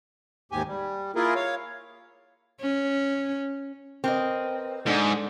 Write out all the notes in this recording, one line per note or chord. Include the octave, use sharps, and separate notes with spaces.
D#2 G#2 G4 G#5
G3
A#3 E4 F4 G#4 A#4
C#5 F5
C#4
C4 A#4 B4 D#5
G#2 D4 A4